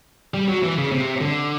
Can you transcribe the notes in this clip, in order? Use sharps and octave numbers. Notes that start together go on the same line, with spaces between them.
G3
F#3
E3
C#3
C3
D3